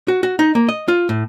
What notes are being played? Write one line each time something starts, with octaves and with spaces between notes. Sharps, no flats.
F#4
F#4
D#4
A#3
D#5
F4
A2